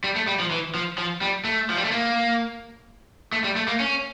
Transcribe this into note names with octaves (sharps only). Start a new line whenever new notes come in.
G3
A3
G3
F3
E3
F3
F3
G3
A3
F3
G3
A3
A#3
A3
G3
A3
A#3
C#4